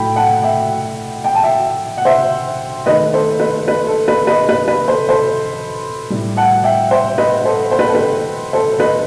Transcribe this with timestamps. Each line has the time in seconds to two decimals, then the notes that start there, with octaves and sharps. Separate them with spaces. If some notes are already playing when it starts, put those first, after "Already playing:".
Already playing: A2 F#3 A3 G5 B5
0.16 F#5 A5
0.43 E5 G5
1.24 G5
1.35 A5
1.43 E5 G5
1.97 F#5
2.05 C5 E5
2.86 D#3 A3 B4 D#5
3.13 A4 C5
3.40 B4
3.68 B4
3.87 A4
4.08 B4
4.27 B4 D#5
4.49 B4
4.68 B4
4.88 A4 C5
5.09 A4 C5
6.10 A2 G3
6.37 F#5 A5
6.64 E5 G5
6.91 C5 E5
7.18 B4 D#5
7.45 A4 C5
7.71 C5
7.79 B4
7.87 A4
7.95 B4
8.53 A4 C5
8.79 B4 D#5